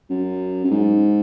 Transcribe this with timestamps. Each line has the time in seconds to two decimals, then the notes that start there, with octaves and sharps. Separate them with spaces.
0.10 F#2
0.65 F#2
0.71 G#2